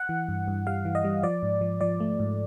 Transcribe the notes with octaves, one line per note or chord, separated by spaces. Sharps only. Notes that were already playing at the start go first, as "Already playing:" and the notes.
Already playing: F#5
E3
G2
G2
G3 F5
E3
D#5
G3
F3 D5
G#2
F3
F3 D5
A3
G#2